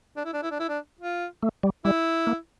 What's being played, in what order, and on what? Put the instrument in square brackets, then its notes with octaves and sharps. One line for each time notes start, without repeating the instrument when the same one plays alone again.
[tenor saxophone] D4
E4
D4
E4
D4
E4
D4
F4
[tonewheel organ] A3
G3
[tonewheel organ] G3 [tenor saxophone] E4
[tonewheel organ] A#3